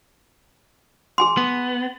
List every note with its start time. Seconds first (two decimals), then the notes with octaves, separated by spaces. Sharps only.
1.18 G#4 G#5 C6
1.37 B3